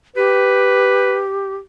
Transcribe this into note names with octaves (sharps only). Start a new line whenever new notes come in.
G4 B4